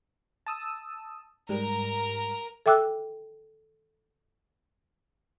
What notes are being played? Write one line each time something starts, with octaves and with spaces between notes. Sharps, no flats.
A5 D#6 E6
G#2 G3 A#4 A#5
A4 E5 G5 D6 E6 F#6